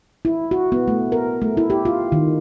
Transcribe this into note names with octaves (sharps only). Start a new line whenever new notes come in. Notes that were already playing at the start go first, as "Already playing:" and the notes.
E4
F#4
B3
A3
A#4
A3
E4
G4
F4
D#3